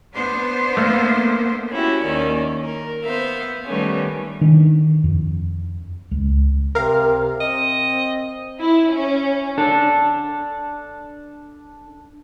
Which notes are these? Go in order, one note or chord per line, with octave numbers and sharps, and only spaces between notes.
B3 D4 C5
A3 A#3
C#4 E4 F#4 G4
D#2 D#3 C#4 D5
A#4
B3 C5 E5 F5
D#3 G3 A3 B3 C#4
D#3 D4
F2
C#2
C3 A#4 F5
C4 D#5
E4
C#4
D4 A4